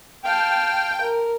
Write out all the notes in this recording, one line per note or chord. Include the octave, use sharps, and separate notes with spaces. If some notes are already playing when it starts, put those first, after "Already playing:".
F5 G5 A5
A#4